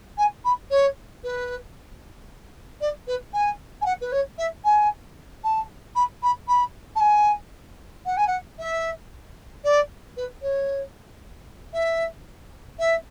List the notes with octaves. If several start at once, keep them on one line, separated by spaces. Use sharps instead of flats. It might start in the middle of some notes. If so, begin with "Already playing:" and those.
G#5
B5
C#5
B4
D5
B4
G#5
G#5
F#5
B4
C#5
E5
G#5
A5
B5
B5
B5
A5
G#5
F#5
G#5
F#5
E5
D5
B4
C#5
E5
E5